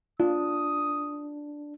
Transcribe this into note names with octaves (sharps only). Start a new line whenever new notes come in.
D4 F4 D#6